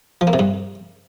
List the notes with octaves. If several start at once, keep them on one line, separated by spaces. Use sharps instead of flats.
F3
A#3
C3
G2